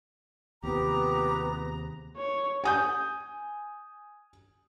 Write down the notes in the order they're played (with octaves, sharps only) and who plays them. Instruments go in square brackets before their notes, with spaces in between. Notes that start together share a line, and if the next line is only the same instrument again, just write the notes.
[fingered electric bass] D#2 C3 [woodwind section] G#2 F3 A#5 [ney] B3 [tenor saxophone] G4
[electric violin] C#5
[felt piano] G#5 D#6 G6